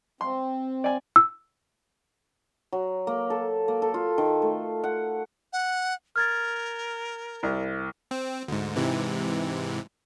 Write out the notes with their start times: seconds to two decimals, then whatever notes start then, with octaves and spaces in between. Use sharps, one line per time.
0.21 C4 C6
0.84 D5 G#5
1.16 E6
2.72 F#3
3.07 A#3
3.30 A4
3.68 A#3
3.82 A4
3.94 F4
4.18 D#3
4.42 A3
4.84 F#5
5.53 F#5
6.16 A#4 F6 G#6 A6
7.43 C2
8.11 C4
8.48 D2 G#2
8.76 G#2 C3 E3